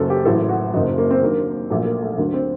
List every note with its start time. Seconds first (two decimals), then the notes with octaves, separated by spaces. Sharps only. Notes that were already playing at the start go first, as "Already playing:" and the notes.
Already playing: F#1 F#2 F#3 A4
0.10 G4
0.25 A1 A2 F#3 A4
0.49 F#4
0.73 F#1 F#2 F#3 D#4
0.98 A#3
1.11 C4
1.22 D#2 D3 F#3 A#3
1.70 A#1 A#2 F#3 A3
1.85 A#3
2.02 A3
2.18 D2 D3 F#3 A#3
2.34 C4